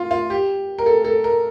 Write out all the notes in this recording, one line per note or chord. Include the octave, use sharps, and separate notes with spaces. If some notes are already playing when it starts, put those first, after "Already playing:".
Already playing: F4
F4
G4
A#4
A4
A4
A#4